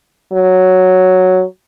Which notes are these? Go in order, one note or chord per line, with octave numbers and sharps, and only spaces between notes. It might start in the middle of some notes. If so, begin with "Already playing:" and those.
F#3